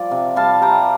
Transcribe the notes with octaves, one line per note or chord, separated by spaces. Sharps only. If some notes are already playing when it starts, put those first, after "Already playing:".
Already playing: F3 G3 D5
C3
G3 F5 A5
G3 G5 A#5